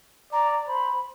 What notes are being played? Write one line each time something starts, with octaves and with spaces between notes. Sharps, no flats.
D5 A#5
C5 B5